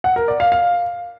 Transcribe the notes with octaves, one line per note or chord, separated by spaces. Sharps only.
F#5
A#4
D5
F5
F5